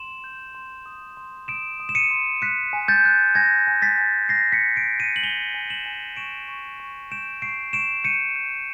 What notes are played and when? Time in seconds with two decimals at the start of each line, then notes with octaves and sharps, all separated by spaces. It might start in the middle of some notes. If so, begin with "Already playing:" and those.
Already playing: C6 E7 F#7
0.24 G6
0.55 C6
0.86 D#6
1.17 C6
1.48 D#6 D7 E7
1.80 D#6
1.89 E7
1.95 C#7 D#7
2.11 C6
2.42 F#6 B6 C#7
2.73 G#5
2.88 G6 A6
3.05 F#6
3.35 G#5 G#6 A#6
3.67 G#5
3.82 A6 B6
3.98 G#5
4.29 G#5 A#6 C7
4.52 B6 C#7
4.61 F#6
4.76 C7 D7
4.93 F#6
5.00 C#7 D#7
5.16 F#7
5.23 G#5 F7 G7
5.54 G#5
5.70 E7 F#7
5.86 G#5
6.17 C#6 D7 E7
6.48 C#6
6.80 C#6
7.12 G6 D7 E7
7.42 C#6 C7 D7
7.73 C#6 D7 E7
8.04 G6 C#7 D#7
8.36 G6